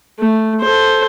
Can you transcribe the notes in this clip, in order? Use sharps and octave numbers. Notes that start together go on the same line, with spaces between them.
A3
A4 C5